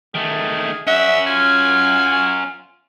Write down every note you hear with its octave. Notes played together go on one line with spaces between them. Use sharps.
D#3 A3 G#4
C#4 F#4 E5 F#5
F4 G#5